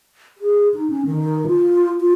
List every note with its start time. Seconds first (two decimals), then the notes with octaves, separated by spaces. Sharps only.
0.38 G#4
0.74 D#4
0.90 C#4
1.05 D#3
1.47 F4
2.00 F4